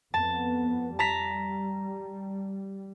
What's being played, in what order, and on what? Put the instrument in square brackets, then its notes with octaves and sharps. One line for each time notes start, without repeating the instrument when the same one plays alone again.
[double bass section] F2 B3 [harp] A5
[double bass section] G3 [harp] A5 A#5 B6